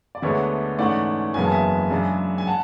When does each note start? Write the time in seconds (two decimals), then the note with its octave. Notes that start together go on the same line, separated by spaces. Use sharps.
0.15 D5
0.22 D2 D3 G#3 B3 D4 C#5 E5
0.78 G#2 E3 A3 C#4 D5 F#5
1.34 F#1 E2 C#3 F#3 B3 G#5
1.44 A5
1.51 E5 G#5
1.90 F#2 C#3 G#3 D4
2.38 G#5
2.47 F#5 A5